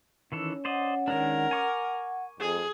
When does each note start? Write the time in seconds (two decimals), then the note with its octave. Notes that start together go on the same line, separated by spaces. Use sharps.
0.32 D#3 E3 C#4 A4
0.65 C5 D5 D#5 F#5
1.08 D#3 G#3 D4 A#4
1.51 G#5 C#6 D6
2.40 F2 G#4